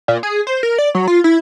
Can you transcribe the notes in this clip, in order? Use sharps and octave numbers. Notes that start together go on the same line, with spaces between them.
A#2
G#4
C5
A#4
D5
F#3
F4
E4